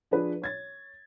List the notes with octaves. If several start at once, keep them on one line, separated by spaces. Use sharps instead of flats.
F3 D4 G#4 B4
C#5 G#6 A6